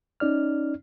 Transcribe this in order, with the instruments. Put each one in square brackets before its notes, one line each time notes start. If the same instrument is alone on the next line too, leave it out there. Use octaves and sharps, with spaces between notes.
[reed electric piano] C#4 D#4 D5 F6